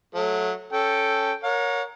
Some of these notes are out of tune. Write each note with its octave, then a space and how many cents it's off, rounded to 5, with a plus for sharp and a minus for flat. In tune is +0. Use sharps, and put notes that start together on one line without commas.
F#3 -20 A3 -15
C#4 +0 A4 +0 G5 +0
A#4 +0 C#5 +10 F#5 -40